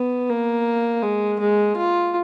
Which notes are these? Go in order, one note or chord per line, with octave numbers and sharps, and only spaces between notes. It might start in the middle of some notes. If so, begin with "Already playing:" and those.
Already playing: B3
A#3
G#3
G#3
F4